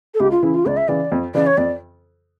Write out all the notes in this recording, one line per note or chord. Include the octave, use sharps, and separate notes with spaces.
A4
C#2 G4
F4
C#3 E3 E4
F4
C#2 D5
E5
C#3 E3 D5
F2
C#3 E3 D5
C#5
F2 D5